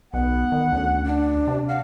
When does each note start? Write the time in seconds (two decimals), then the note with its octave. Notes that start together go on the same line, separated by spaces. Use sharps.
0.14 B1 B3 F#5
0.52 D#3
0.72 D2 C#4
1.06 D4
1.47 C3
1.69 F5 F#5